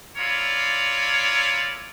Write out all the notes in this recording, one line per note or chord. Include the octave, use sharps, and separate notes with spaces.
E4 F4 A#4 C#5 D5